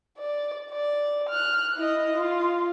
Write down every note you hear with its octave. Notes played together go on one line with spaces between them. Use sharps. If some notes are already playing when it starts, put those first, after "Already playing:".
D5
D5
F6 F#6
E4 D#5
F4